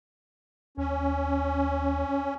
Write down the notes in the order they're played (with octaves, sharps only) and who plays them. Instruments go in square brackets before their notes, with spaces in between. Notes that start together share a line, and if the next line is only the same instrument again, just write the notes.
[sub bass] D#2 [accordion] C#4